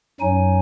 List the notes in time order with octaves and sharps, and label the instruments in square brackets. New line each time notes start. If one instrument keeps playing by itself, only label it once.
[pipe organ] F#2 F#3 D#4 G#5